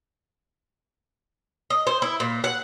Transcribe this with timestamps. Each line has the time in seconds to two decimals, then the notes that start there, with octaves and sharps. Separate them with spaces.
1.70 D#5
1.87 C5
2.02 E4
2.20 A#2
2.44 F#5